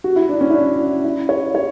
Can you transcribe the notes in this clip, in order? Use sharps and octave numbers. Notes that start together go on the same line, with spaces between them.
F#4
E4
D4
C#4
E4
D4
E4
C#5
C#5